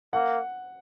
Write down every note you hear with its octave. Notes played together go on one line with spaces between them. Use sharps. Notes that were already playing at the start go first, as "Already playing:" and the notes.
A#3 F#5